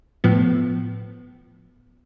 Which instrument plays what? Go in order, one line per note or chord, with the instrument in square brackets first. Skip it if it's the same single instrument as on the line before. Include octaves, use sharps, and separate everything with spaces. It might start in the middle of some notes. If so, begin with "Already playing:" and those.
[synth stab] A2 F3 B3